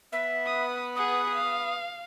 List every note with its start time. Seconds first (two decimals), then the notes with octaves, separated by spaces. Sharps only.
0.12 B3 B4 E5
0.46 D#6
0.96 G#4 F#5 D#6
1.35 F5